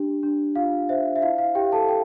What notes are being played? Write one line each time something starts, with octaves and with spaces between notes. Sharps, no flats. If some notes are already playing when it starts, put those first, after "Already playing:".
Already playing: D4 G4
D4
F4 F5
C5 E5
E5
E4 F5
F5
E4 G4 G5
A4 A5
A4 G5